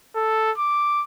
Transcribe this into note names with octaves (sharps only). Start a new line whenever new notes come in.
A4
D6